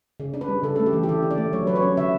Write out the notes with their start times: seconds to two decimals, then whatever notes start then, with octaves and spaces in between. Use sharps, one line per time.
0.20 C#3
0.34 D4
0.41 B4
0.48 G3
0.63 C#3 A4
0.76 A3 A4
0.86 G4
0.93 E3
1.03 G4
1.09 D3 A4
1.23 D4
1.31 D5
1.38 A3
1.53 F#3 C#5
1.67 F#3 B4
1.76 C#5
1.82 C#4
1.97 D3 E5